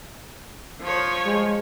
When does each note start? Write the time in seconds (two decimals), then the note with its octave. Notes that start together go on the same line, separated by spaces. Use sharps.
0.82 F3 C#5
1.26 G#3